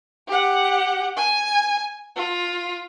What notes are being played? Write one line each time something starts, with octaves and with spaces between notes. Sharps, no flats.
G4 F#5
G#5
F4